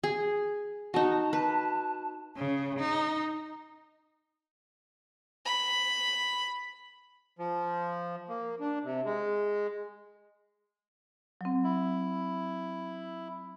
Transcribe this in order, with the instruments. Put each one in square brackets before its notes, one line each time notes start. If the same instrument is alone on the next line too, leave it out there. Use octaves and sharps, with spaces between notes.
[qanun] G#4
[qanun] D#4 F#4 [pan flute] A5
[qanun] B4
[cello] C#3
D#4
[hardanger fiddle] B5
[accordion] F3
A#3
D4
C3
G#3
[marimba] F#3 C4
[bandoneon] E4